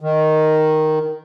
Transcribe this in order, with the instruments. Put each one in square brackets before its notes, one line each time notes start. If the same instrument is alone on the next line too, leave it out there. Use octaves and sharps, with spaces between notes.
[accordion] D#3